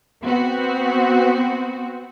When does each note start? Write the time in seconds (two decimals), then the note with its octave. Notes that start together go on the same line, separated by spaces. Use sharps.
0.22 B3 C4 F#4